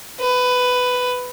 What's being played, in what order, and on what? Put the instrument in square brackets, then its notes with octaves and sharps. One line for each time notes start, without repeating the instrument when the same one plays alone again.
[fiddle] B4